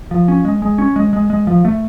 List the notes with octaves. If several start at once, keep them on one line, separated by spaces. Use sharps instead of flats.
F3
C#4
G#3
G#3
C#4
G#3
G#3
G#3
F3
A3